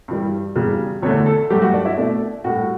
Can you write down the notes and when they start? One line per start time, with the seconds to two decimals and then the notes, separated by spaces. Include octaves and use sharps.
0.08 G2 E3 G3
0.56 E2 C#3 G3
1.02 E2 D3 A3 C#5
1.26 A4
1.50 G2 F#3 A3 G4
1.62 F#4
1.74 D4
1.85 E4
1.97 B2 A3 D4
2.44 A2 G3 F#4